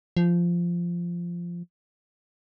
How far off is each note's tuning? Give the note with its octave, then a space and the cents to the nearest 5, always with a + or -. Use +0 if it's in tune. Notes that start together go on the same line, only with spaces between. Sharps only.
F3 -10